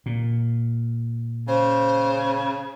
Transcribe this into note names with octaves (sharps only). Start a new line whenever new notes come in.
A#2
C#3 C5